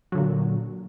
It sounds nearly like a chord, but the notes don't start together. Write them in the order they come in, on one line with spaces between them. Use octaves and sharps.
F#3 D3 A#2